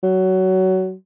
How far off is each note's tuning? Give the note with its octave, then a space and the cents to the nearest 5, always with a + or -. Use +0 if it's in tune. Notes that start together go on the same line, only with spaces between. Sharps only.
F#3 +20